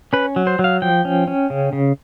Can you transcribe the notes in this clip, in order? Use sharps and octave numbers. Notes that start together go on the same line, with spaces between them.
C#4 B4
F#3
C5
F#3
F5
F3 G5
C#4
C#4
C#3
C#3